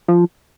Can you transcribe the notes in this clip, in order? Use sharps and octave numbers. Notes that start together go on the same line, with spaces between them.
F3